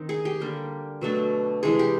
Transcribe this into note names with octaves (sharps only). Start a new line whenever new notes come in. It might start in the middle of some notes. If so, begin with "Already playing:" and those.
Already playing: D#3 C4 D#4
G#4
G4
D3 G3 A#3
B2 F#3 A3 D4
C3 E3 G#3 G#4
G4